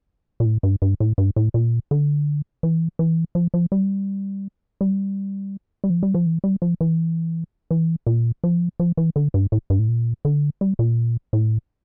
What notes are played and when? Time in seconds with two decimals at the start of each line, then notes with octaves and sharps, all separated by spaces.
0.40 A#2
0.45 A2
0.63 G2
0.82 G2
1.00 A2
1.18 G2
1.36 A2
1.54 A#2
1.91 D3
2.63 E3
2.99 E3
3.35 F3
3.54 F3
3.72 G3
4.81 G3
5.84 G3
5.90 F3
6.03 G3
6.15 F3
6.26 E3
6.44 G3
6.62 F3
6.81 E3
7.71 E3
8.07 A#2
8.44 F3
8.80 F3
8.97 E3
9.16 D3
9.34 G2
9.52 A2
9.70 G2
9.79 A2
9.88 A#2
10.25 D3
10.61 G3
10.79 A#2
11.33 A2